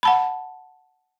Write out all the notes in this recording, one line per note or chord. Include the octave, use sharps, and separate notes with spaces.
F#5 A5 B5